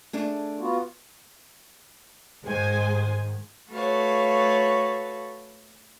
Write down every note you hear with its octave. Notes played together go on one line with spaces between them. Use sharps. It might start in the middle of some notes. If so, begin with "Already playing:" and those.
A3 D4 G#4
B3 F4 F#4
G#2 D#3 G#3 C5 G#5
A3 F#4 A4 B4 C#5 F5